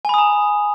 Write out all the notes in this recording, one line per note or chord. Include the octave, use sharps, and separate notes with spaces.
G#5 A#5 B5 D#6